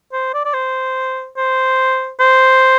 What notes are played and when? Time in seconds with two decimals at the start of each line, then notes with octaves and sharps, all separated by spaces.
0.13 C5
0.34 D5
0.45 D5
0.54 C5
1.37 C5
2.19 C5